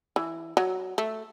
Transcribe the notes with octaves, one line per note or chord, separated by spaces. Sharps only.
E3
F#3
A3